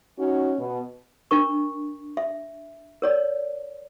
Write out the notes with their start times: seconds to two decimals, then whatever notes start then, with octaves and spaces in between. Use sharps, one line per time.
0.18 C#4 D#4 F#4
0.59 B2
1.31 D4 A#4 C#6
2.17 E5
3.02 A#4 C#5 D5